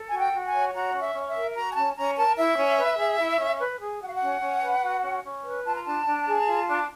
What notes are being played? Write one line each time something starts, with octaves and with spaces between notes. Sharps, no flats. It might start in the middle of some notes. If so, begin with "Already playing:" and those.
Already playing: A4
F#4 G#5
G5
F#4
G#5
C#5
F#4 A#5
C#4
E5
C#4
E5
A#4
F#4 A#5
G#5
C#4 A5
C#4 A#5
A#4 A5
E4 E5
C#4
B4
G#4
E4
C#4
B4
G#4
F#4 F#5
F5
F#5
C#4
C#4
B4
F#4
C#4
C#4
B4
F4 A5
A#5
D4 A5
D4
G#4
F4
D4